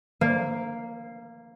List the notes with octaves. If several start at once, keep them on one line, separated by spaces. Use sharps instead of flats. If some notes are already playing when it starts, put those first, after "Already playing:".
A#3